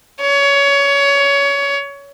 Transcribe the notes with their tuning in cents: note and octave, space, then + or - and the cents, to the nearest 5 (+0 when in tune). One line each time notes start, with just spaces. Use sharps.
C#5 +20